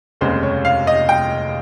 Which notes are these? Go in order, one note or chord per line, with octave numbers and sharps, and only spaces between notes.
F1 D#2 C#3 G#3 C4 C5
C#5
F5
D#5
G5